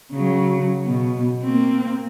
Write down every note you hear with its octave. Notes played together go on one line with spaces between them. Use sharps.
C#3 F#3
B2
A#3 C4